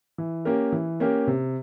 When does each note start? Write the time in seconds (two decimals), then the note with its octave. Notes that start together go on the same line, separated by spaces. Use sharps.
0.18 E3
0.45 A#3 C#4 G4 A#4
0.72 E3
1.00 A#3 C#4 G4 A#4
1.27 C3